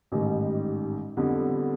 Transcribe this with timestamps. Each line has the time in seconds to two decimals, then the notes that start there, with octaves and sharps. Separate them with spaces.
0.12 A1 G#2 D#3 G3
1.17 F2 D3 G3 B3